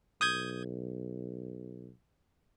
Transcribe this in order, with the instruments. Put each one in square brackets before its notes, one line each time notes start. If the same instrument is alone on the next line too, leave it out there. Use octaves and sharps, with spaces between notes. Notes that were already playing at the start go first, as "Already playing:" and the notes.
[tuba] B1 [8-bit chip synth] D#6 G6 G#6